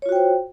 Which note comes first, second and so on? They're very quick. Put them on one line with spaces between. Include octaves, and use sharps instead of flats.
C#5 F4 F#4 G5 C5